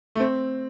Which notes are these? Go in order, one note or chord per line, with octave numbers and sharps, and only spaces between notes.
A3
C4